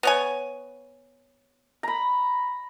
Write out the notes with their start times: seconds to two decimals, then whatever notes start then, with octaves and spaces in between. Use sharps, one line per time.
0.03 B3 C#5 G#5
1.83 A#5 B5